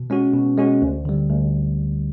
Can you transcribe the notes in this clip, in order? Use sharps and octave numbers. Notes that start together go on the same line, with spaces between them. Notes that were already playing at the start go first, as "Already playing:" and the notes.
Already playing: B2
G#3 C#4 F#4
B2
G#3 C#4 F#4
D2
D3 G3
D2